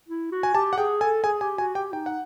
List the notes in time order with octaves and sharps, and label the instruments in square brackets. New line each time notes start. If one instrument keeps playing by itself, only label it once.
[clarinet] E4
F#4
[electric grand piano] G#5
[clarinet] G4 [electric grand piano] A5
[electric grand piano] F#5
[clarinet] G#4 [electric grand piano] G5
[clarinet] A4 [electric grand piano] G#5
[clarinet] G#4 [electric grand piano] G#5
[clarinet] G4 [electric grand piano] G#5
[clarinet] F#4 [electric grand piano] G#5
[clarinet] G4 [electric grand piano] G5
[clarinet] D#4 [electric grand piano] G5
[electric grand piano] F#5